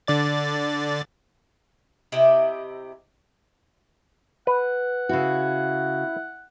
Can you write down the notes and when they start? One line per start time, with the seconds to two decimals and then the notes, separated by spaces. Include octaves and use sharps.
0.07 D3 D5 A6
2.12 C3 E4 G4 D#5
4.47 B4 F#5
5.09 C#3 E4 F#4